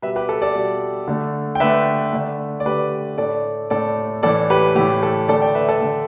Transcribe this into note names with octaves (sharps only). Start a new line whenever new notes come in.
B2 G3 B4 E5
G4 B4
A4
A4 D5
B2 G3
D3 A3
G5
D3 A3 B4 E5
D3 A3
D5
D3 A3 G4 B4
A2 A3 A4 D5
A2 A3 A4 D5
A2 E3 A3 A4 D5
G4 B4
A2 E3 A3 G4
A4
D3 A3 A4 D5
D5 G5
B4 E5
A4 D5
D3 A3